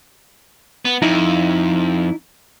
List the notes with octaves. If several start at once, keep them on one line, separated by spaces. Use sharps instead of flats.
B3
F2 D#4 E4